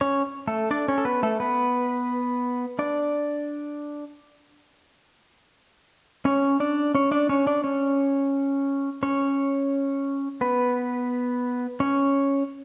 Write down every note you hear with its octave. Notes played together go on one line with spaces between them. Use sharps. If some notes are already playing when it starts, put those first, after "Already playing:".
C#4 C#5
A3 A4
D4 D5
C#4 C#5
A4
B3 B4
A3 A4
B3 B4
D4 D5
C#4 C#5
D4 D5
C#4 C#5
D4 D5
C#4 C#5
D4 D5
C#4 C#5
C#4 C#5
B3 B4
C#4 C#5